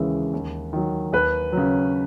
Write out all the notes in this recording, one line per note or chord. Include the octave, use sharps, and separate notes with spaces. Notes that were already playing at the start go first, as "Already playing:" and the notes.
Already playing: D#2 C#3 E3 G#3
D#2
D#3 F#3
D#2 B4
C#3 F#3